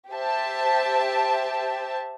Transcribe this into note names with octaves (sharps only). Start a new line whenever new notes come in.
G4 C5 E5 A5